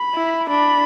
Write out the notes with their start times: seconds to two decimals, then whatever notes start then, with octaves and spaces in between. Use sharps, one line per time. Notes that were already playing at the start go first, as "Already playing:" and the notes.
Already playing: B5
0.14 E4
0.49 D4 B5